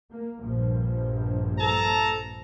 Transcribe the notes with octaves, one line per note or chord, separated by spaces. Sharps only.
A#3
A#1 G2 F3
A4 A5 A#5